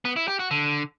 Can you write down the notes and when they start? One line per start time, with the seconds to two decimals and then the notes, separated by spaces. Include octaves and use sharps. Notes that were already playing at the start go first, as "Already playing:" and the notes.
0.05 B3
0.16 E4
0.28 G4
0.39 F#4
0.51 D3